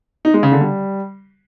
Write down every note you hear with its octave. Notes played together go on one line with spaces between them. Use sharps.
D#4
G#3
C#3
D3
G3